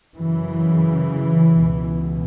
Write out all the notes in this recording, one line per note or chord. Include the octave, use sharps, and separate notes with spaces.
F#2 C#3 E3
C#2 B2